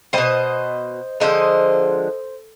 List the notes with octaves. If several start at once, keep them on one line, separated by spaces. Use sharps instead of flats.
B2 G3 C5 D#5
D3 F3 G#3 C5 D#5